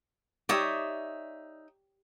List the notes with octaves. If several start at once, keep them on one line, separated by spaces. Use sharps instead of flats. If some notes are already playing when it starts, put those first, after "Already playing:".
D#4 G4 C#5 D5 E5 D#6